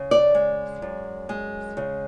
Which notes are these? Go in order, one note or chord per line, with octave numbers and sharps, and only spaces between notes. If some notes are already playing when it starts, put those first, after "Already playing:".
Already playing: C#3
D5
G#3
F#2
G#3
C#3